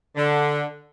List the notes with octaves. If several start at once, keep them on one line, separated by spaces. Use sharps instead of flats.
D3